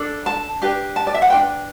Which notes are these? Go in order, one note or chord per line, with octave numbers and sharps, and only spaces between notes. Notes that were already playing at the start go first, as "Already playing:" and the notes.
Already playing: D4 A4
A5
D4 G4 B4
A5
D5
E5
F#5
D4 F#4 B4 G5